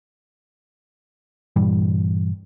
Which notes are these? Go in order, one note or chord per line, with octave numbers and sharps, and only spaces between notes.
G2 A#2 E3 G3